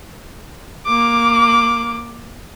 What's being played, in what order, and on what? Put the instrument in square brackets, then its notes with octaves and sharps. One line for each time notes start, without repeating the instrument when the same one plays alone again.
[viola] A#3 D6